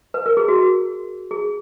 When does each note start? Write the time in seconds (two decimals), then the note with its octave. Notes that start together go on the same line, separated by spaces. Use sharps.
0.14 B4
0.26 A#4
0.37 G#4
0.48 F#4
1.31 G#4